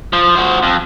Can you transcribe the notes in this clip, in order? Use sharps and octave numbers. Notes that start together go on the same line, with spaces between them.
F3
F#4 C5
F2